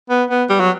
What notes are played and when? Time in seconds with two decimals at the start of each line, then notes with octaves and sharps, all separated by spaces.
0.10 B3
0.30 B3
0.49 G3
0.60 F#3